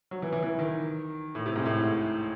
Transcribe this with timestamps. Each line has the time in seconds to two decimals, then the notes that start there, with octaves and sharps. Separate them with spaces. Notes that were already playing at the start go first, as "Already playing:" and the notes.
0.11 F#3
0.22 E3
0.33 E3
0.43 E3
0.59 D#3
1.35 A2
1.46 C3
1.56 G#2
1.65 A2